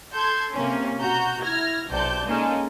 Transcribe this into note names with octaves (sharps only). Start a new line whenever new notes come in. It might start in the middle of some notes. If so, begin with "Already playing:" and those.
A4 C6 G6 G#6
C3 A#3 C#4
B2 F#4 A#5 G6
E4 F6 G#6 A#6
B1 C3 D5 A5 G6
G#3 A#3 C#4 D#4 G#4 A4